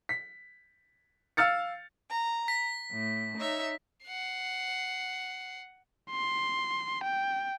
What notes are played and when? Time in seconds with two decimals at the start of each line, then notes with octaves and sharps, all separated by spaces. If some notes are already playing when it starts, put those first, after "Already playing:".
0.09 B6
1.37 F5 E6 F6 A6 C#7
2.10 A#5
2.48 B6
2.91 A2
3.38 D#4 C#5 E5
4.06 F#5 C7
6.11 C6
7.03 G5